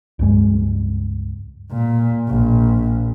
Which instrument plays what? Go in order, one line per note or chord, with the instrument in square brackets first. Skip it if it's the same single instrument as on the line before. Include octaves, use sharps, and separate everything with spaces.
[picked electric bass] C#2 G2 G#3
[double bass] A#2
A#1